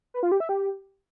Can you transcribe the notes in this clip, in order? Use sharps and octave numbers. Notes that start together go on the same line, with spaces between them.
B4
F4
G4
E5
G4